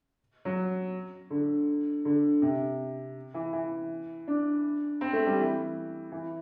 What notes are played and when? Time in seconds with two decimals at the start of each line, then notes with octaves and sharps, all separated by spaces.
0.45 F#3
1.30 D3
2.05 D3
2.42 C3
3.34 E3
3.53 E3
4.27 D4
5.01 C4
5.13 A3
5.26 G3
5.38 E3
6.12 E3